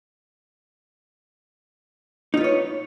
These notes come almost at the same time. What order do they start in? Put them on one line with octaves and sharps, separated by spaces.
D#4 F4 B4 C#5